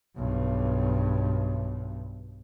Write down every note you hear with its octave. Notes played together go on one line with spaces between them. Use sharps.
B1 G2